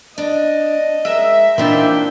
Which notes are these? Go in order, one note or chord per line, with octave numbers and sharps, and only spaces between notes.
D4 D#5
G#3 A#4 E5
A#2 E3 C4 D4 D#4 G5